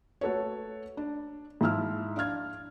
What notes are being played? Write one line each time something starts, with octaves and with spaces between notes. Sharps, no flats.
A3 F#4 A4 B4 C#5
D4
G#2 F3 E4 E6 F6
D4 F5 F6 G#6